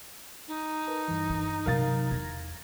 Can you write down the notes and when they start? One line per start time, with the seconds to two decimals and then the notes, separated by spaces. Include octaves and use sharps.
0.48 D#4
0.86 A#4 B4 A5
1.08 G2 E3
1.30 D4
1.66 C3 F#3 A#4 F5 A6
2.11 E2 G#6 A#6